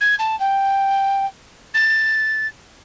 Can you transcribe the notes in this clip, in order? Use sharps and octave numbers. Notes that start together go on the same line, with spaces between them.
G#6
A5
G5
A6